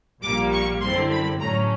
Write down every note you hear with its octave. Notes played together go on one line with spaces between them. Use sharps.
A#1 A#2 G3 A#3 D6
C#6
F#2 D3 G3 C4 E4 C6
B5
A2 F#3 A3 C#4 A#5